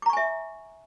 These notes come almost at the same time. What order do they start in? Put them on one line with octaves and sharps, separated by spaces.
D6 A#5 C#6 G#5 E5